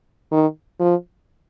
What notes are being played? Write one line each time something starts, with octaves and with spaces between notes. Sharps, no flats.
D#3
F3